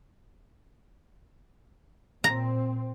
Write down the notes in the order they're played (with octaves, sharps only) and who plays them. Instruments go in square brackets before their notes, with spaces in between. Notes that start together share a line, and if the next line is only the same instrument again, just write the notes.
[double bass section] A#2 C4 [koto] A#5